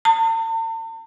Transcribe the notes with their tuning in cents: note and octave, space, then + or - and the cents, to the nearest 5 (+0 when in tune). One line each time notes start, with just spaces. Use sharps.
A5 +45